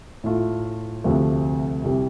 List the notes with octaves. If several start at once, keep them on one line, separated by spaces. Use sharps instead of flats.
A2 A3 F4
D2 C3 F3 A3
C2 C3 G3